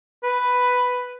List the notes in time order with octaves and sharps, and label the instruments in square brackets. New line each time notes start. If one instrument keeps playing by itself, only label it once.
[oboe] B4